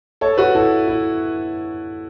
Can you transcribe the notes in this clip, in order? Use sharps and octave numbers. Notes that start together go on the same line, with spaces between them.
A4 C#5
F#4 B4
E4 A4
E4